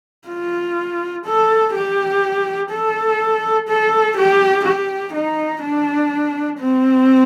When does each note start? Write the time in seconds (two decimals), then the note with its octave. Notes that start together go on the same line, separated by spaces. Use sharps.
0.28 F4
1.25 A4
1.74 G4
2.71 A4
3.68 A4
4.17 G4
4.65 G4
5.13 D#4
5.62 D4
6.59 C4